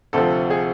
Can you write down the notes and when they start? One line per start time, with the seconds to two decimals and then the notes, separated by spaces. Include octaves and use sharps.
0.13 D2 C3 F3 A4
0.50 G#4